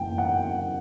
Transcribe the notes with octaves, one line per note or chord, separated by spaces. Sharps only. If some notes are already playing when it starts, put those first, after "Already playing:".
Already playing: F#1 F#2 E3 G5
F#5